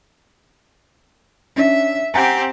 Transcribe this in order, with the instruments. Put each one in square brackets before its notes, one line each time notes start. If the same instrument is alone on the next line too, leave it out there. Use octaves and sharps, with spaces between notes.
[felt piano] C#4 D4 [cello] E5
[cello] C4 G4 [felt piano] F#5 G#5 A#5